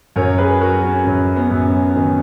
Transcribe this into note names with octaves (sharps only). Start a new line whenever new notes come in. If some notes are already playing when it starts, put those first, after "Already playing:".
F#2 A#4 C#5
G#4 B4
F#3 F#4 A#4
C#4
F#2 C#4
B3
F#2
C#4
B3
D#3 C#4